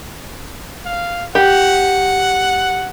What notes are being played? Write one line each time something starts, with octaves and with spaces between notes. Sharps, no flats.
F5
G4 F#5